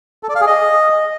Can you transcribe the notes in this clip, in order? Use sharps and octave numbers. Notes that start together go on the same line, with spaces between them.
A4
D5
F5
G#4
D#5